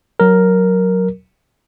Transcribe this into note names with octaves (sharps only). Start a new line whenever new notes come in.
F#3 A#4